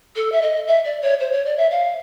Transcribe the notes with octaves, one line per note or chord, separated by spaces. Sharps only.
A4
E5
D#5
E5
D5
C#5
C5
C#5
D5
E5
F5